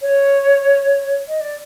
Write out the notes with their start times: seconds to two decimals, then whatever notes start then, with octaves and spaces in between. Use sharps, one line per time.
0.02 C#5
1.28 D#5
1.41 D5